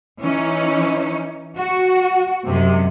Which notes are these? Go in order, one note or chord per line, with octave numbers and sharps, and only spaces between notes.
E3 C#4 D#4
F#4
F#2 C3 G#3